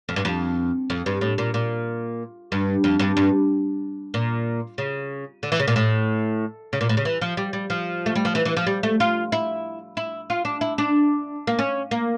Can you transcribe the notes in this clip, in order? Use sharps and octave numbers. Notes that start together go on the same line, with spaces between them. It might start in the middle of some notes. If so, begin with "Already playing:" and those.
F2
G2
F2
F2
G2
A2
A#2
A#2
G2
F2
G2
G2
A#2
C#3
D3
E3
C#3
A#2
A2
C#3
A#2
A2
C#3
E3
F3
G3
G3
F3
A3
G3
F3
E3
E3
F3
G3
A3
F4
E4
E4
F4
D4
E4
D4
A#3
C#4
A#3